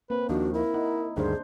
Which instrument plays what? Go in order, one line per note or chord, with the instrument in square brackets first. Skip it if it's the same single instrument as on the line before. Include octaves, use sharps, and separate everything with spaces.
[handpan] A#3 C4 [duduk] B4
[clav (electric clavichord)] D#2 D#3 F3 [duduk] D4 [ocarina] F#4
[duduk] E4 [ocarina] A#4
[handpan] D#4 [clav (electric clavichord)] F#5
[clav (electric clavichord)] D2 G2 D#3 [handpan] D4 C5 [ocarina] G#4